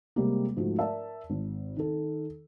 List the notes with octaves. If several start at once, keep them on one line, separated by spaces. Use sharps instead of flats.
C3 G3 G#3 A#3
G#2 F3 A3 F#4
A#4 D5 E5 A5
G#1
D#3 A4